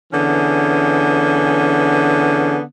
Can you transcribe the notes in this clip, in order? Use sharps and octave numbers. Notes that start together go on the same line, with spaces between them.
D3 E3 B3 C#4 G#4